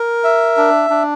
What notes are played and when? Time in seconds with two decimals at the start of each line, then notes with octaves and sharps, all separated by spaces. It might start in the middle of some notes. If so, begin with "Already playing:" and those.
Already playing: A#4
0.24 E5
0.57 D4
0.90 D4